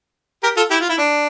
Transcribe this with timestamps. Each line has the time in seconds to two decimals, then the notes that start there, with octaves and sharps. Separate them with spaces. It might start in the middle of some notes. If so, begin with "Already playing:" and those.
0.43 G4 A#4
0.57 F4 A4
0.70 E4 G4
0.81 F4
0.89 E4
0.98 D4